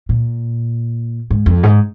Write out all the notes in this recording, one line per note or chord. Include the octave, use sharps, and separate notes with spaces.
A#2
G#2
F2
G#2